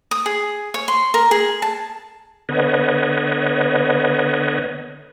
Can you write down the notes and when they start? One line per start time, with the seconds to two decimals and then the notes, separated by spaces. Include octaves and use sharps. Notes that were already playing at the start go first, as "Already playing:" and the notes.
0.11 D#6
0.26 G#4
0.74 C#5
0.88 C6
1.14 A#4
1.31 G#4
1.62 A5
2.49 D3 B3 B4 C#5 D#5